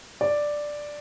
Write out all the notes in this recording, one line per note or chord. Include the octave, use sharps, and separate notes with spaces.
D5